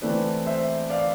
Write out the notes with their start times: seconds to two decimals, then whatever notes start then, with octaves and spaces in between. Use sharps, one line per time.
0.02 E3 A3 C4 B4 D5
0.46 C5 E5
0.90 D5 F5